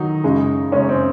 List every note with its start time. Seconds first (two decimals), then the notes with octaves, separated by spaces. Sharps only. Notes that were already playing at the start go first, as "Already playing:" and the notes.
Already playing: D#3 F#3 D#4
0.24 F#2 C#3 G#3
0.72 F#2 C#3 G#3 C#4
0.89 C4